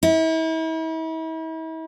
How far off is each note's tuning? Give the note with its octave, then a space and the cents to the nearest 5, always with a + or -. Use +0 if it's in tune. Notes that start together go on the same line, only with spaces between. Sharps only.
E4 -40